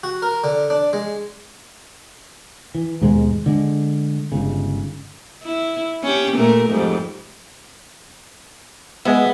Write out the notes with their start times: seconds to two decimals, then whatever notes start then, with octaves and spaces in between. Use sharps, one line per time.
0.03 F#4
0.22 A#4
0.44 D3
0.70 D4
0.93 G#3
2.75 E3
3.01 D#2 G#2 B2 G#3
3.46 D3 G#3
4.32 G1 G#2 C#3
5.43 E4
6.04 C#4 G4
6.36 A#2 A3 A#4
6.70 F2 G#2 G3
9.05 G#3 B3 E5